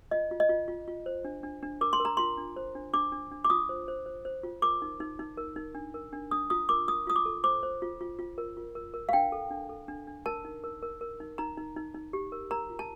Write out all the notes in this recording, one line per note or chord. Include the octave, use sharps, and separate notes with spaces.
F4 D#5
F4
D#5
F4
F4
F4
C5
D4
D4
D4
A#4 D6
C6
A#4
A#5
F4 C6
D4
C5
D4
D4 D6
D4
D4
D6
F4 D#6
C5
C5
C5
C5
F4
A#4 D6
D#4
D#4
D#4
A#4
D#4
D4
A#4
D4
D4 D#6
F4 D#6
A#4 D6
F4 D#6
F4 D#6
D6
A4
C5 D6
C5
F4
F4
F4
A#4
F4
A#4
A#4
F5
D4 G5
A4
D4
A4
D4
D4
A#4 A5
D#4
A#4
A#4
A#4
D#4
D#4 A#5
D#4
D#4
D#4
G4
A#4
A#4 A#5
F4
A5